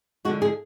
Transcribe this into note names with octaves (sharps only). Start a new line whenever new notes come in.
D3 F3 G#3 F#4
G#4